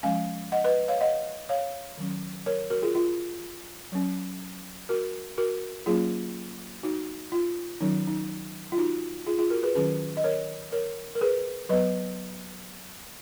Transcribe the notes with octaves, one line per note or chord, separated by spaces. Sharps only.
F3 G#3 C#4 F5 G#5
D#5 F#5
B4 D#5
C#5 F5
D#5 F#5
C#5 F5
D#3 F#3 C#4
A#4 C#5
F#4 A#4
F4 G#4
F4
F#3 C#4
F#4 A#4
F#4 A#4
F#3 A#3 C#4 F4 G#4
D#4 F#4
F4
D#3 F#3 C#4 D#4
D#4
F4
D#4 F#4
F4 G#4
F4 G#4
F#4 A#4
G#4 B4
D#3 F#3 C#4 G#4 B4
D#5
A#4 C#5
A#4 C#5
A#4
G#4 B4
F#3 B3 B4 D#5